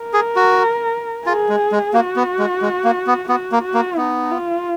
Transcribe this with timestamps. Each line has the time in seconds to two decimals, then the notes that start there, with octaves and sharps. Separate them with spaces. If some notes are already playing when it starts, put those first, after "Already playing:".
Already playing: A#4
0.14 G#4
0.36 F#4
1.26 F4 G#4
1.49 G#3
1.72 G#3
1.94 A#3 F#4
2.16 B3
2.39 G#3
2.62 G#3
2.84 A#3
3.07 B3
3.29 B3 F#4
3.52 A#3
3.63 F#4
3.74 A#3
3.97 B3 D#4
4.31 F4